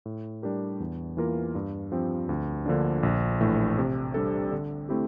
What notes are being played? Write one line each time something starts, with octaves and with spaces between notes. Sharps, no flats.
A2
G3 D4 G4 A#4
E2
E3 A#3 F4 A#4
G2
F3 C4 G4
D2
D3 F3 A#3 D4
A#1
A2 E3 A3
C3
G3 D4 A4
D3
A3 C4 E4 G4